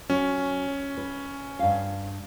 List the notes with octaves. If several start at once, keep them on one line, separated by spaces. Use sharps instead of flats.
F#3 C#4
B4
G2 F5